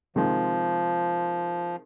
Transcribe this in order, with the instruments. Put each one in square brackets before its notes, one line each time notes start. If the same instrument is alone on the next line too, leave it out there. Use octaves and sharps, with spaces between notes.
[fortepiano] C3 D#3 G#3 [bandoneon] F3